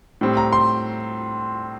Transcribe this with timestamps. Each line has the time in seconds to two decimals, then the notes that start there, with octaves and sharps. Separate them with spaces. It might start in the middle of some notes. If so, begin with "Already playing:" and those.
0.21 A2 G3 C4
0.37 A#5
0.53 C6